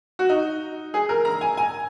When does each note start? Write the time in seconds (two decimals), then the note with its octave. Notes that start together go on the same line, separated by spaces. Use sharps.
0.19 F#4
0.29 D#4
0.94 G#4
1.09 A#4
1.25 A#5
1.41 G#5
1.57 G#5